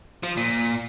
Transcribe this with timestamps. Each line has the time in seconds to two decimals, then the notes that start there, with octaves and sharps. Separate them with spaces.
0.23 F3
0.37 A#2